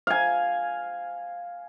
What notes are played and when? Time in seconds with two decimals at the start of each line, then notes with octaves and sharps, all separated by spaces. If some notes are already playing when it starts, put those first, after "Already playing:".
0.07 F5 G#5